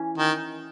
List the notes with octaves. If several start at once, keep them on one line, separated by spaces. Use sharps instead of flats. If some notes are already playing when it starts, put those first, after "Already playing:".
Already playing: E3 C#4
D#3